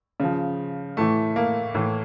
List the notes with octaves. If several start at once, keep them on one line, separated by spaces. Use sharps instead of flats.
C#3 F3
A2 E3 A3
A#3
A2 E3